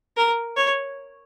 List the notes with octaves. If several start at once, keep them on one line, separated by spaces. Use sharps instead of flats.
A#4
C#5